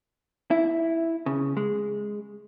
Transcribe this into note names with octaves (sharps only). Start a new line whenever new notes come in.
E4
C#3
G#3